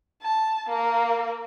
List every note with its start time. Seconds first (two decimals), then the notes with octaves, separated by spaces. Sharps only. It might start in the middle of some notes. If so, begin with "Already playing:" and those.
0.23 A5
0.69 A#3 A#4